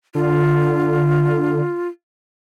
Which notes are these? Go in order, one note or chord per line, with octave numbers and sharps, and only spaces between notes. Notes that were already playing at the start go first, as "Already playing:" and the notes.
D3 F4